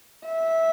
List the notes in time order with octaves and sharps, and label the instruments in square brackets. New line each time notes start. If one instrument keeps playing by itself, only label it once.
[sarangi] E5